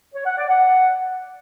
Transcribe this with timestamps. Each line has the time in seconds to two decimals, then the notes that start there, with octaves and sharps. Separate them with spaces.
0.15 C#5
0.26 F#5
0.38 D5
0.50 F#5